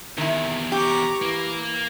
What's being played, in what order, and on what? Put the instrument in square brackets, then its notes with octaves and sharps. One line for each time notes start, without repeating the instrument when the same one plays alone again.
[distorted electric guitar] E2 C3 [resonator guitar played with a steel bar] D#3 E4
[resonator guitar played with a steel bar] G4 [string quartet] A#5 C#6 D6
[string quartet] E3 [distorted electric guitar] A#3